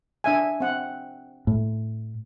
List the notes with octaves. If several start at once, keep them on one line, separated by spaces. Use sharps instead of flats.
D4 E5 G#5
C4 F#5
A2